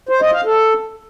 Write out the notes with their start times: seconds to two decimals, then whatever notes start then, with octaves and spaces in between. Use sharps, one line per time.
0.09 C5
0.21 D#5
0.33 F5
0.45 A4